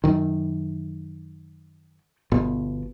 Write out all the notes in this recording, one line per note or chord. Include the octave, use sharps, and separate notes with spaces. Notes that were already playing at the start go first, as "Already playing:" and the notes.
F#2 D#3
G1 B2